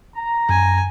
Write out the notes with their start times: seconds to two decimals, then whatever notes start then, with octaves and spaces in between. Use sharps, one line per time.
0.16 A#5
0.49 F#2 G#5